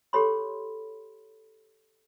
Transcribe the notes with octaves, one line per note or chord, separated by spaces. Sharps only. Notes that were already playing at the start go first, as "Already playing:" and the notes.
G4 A4 C#5 B5 C6